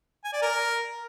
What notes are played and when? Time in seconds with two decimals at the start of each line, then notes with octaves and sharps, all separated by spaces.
0.25 G#5
0.33 D5
0.42 A#4